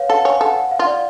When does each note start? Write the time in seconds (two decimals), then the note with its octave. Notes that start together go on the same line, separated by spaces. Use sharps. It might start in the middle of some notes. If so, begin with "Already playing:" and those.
Already playing: B4 C#5 F5
0.10 A4 F#5
0.25 C#5 G#5
0.40 A4 F#5
0.56 F#5
0.71 F5
0.79 F4
0.87 D5